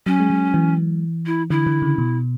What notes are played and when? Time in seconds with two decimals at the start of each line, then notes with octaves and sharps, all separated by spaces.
0.06 F#3 C#4
0.20 G#3
0.30 F#3
0.54 E3
1.26 E4
1.50 D3 E4
1.67 D3
1.82 C#3
1.98 B2